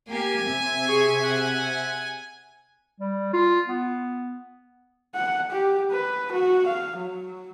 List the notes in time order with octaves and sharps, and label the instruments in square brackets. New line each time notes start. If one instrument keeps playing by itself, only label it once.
[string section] A#3 G4 [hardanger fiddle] G#5
[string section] C3 E5
[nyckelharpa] G#4 C#6
F#5
[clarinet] G3
F4
B3
[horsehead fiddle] F#5
G4
B4
F#4
F5
F#3